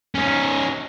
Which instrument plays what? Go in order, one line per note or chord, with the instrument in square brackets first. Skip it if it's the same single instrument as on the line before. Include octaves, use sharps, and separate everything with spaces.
[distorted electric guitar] C#4 D#4